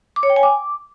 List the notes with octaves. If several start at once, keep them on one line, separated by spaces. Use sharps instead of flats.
D6
C#5
G5
G#5
D6